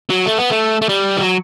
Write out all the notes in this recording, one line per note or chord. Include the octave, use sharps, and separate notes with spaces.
F#3
A3
B3
A3
A3
G3
E3
F#3